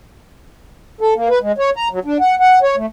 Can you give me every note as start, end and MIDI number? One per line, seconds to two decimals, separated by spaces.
1.01 1.14 69
1.16 1.28 58
1.29 1.39 71
1.42 1.52 56
1.58 1.70 73
1.76 1.88 82
1.91 1.99 54
2.05 2.17 62
2.20 2.35 78
2.40 2.59 78
2.62 2.76 73
2.76 2.86 57